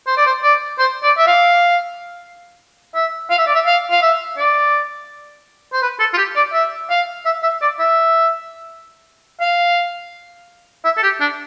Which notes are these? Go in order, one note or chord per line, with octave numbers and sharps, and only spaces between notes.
C5
D5
C5
D5
C5
D5
E5
F5
E5
F5
E5
D5
E5
F5
F5
E5
D5
C5
B4
A4
F4
G4
D5
E5
F5
E5
E5
D5
E5
F5
E5
A4
G4
D4